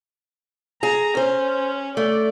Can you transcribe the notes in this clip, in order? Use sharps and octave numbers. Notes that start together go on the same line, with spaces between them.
G#4 A#5
C#4 C5
A3 D5